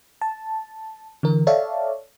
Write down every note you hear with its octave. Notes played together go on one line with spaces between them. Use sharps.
A5
D3 E3 A#4
A4 C#5 D5 E5 F5 A5